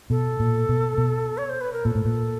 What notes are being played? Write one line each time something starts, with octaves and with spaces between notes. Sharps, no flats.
B2 A4
A#2
B2
B2
C#5
C5
B4
A#4
A#2 A4
A2
A#2